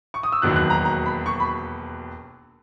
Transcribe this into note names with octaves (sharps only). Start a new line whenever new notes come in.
C#6
D#6
E6
E1 D#2 D#3 F#3 F#6
F#6
A#5
A#5
B5
C#6
B5